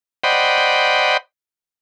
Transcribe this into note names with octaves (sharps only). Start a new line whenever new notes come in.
C5 D5 D#5 F#5 G5 B5